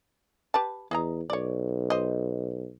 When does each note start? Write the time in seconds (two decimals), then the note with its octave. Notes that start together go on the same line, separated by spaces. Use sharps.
0.54 G4 B4 A5
0.91 E2 G#4 D#5 A#5
1.30 B1 C#5 D5
1.90 C5 D#5